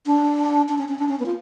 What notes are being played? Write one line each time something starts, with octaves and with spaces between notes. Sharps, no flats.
D4
D4
C#4
C#4
D4
C#4
B3
F4